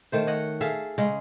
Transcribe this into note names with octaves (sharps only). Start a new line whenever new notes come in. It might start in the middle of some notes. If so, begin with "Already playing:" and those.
D#3 A3 C5
C#5 D#5 F#5
G#4 A4 E5 F5
C#3 G#3